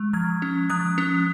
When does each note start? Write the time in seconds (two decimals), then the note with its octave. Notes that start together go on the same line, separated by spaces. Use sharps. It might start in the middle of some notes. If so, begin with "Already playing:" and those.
Already playing: G#3
0.13 F3 F6 G#6
0.42 C#4
0.70 F3 D#6 F#6
0.98 C#4